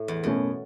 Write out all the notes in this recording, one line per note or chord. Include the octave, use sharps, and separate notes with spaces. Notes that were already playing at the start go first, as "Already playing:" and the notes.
Already playing: A2
E2
F#2 B2 A3 C#4